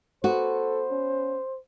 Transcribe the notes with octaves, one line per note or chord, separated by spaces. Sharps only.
B3 F#4 A4 C5
C#4